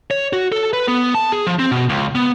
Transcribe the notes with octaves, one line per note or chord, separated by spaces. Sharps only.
C#5
F#4
A4
B4
B3
A5
G#4
F3
C4
B2
C#2
B3